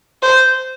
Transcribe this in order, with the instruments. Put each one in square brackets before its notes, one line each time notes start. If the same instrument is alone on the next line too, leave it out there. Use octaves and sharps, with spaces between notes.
[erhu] C5